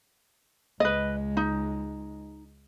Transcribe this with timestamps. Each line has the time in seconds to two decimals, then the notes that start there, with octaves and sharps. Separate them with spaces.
0.80 C#2 G#3 B4 D#5
1.37 D#4